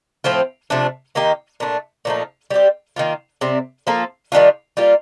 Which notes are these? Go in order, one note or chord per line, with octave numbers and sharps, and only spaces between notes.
A2 F3 C4 F4
C3 F3 A3 D4
D#3 A#3 D#4 G4
A#2 A3 D4
A#2 F3 A3 D#4
G3 C4 G4
D#3 A#3 F4
C3 G3 C4
F3 A#3 F4 A4
D#3 G3 D4 F4
G3 A#3 F4